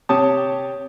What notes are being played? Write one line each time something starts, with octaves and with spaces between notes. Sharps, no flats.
C3 G4 C#5 A5 D#6